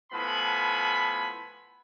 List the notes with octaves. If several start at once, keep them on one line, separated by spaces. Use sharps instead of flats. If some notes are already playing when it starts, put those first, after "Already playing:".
A2 F3 B3 G#5 B5